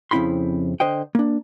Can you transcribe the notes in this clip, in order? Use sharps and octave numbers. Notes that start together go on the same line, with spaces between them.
F2 C#3 C4 E4 B5 C6
D3 C5 D#5 G5
A#3 D4